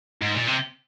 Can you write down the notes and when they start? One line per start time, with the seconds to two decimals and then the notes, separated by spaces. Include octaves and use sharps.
0.22 G#2
0.35 A#2
0.48 C3